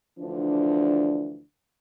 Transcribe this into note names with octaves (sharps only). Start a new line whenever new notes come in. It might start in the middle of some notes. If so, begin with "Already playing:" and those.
D2 E3 F3 D4